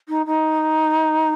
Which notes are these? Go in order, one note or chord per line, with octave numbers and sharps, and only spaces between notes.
D#4
D#4